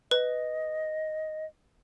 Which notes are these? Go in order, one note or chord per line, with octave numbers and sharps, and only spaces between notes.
B4 D#5